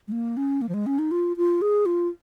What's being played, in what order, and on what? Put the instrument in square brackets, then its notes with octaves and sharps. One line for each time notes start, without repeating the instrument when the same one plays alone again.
[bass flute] G#3
A#3
C#4
A#3
F3
G#3
C#4
D#4
F4
F4
G#4
F4